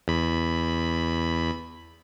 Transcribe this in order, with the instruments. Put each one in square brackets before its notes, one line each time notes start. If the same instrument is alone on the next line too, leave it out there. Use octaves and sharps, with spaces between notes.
[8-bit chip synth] E2 B5